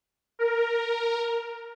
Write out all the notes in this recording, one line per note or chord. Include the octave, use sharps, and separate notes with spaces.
A#4